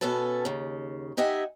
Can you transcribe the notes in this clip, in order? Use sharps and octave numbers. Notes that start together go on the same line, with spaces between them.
B2 B3 C#4 A4 B4 A5
D#2 C#3
D#4 G4 D#5 E5 F#5 G#5